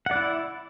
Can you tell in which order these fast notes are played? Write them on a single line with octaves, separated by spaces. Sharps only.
F#5 D5 E4